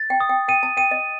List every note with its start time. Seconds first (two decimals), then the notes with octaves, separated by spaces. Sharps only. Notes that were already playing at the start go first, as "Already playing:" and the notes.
Already playing: A6
0.10 G5
0.20 D#6
0.29 G5
0.48 G5 D#7
0.63 A5
0.77 G5 D#7
0.91 D#5